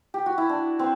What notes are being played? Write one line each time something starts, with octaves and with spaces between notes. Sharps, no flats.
G4
F#4
E4
D4
C4